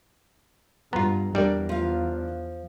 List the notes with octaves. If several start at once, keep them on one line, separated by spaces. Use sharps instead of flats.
G2 B3 F4 A#5
E2 G3 D4 A#4 D5
F3 F5